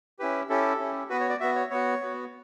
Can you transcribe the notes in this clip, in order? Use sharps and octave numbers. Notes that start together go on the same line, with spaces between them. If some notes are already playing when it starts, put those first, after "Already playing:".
C#4 E4 G4 B4
C#4 E4 G4 A4
C#4 E4 G4
B3 F#4 B4
C#5
D5
B3 F#4 E5
C#5
B3 F#4 C#5
B3 F#4